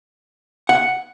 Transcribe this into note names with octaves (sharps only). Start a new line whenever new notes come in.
F#5